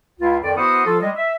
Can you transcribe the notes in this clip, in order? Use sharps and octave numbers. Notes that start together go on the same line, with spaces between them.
C#2 E4 F4
F2 D#3 D5
B3 E4 F#4 C5 F#5 D#6
F3 F4 A4
G3 G#3 D#5
E5